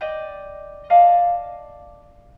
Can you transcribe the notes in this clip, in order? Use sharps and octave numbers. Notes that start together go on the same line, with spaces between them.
D5 D#5 G5
D5 D#5 F5 A5